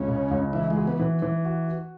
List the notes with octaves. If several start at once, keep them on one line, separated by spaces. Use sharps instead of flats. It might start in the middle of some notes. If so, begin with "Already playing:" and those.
Already playing: C#2 C#4
C#3
C#2
E3 E4
G#3
F#4
B3
E3
E3
F#4
F#4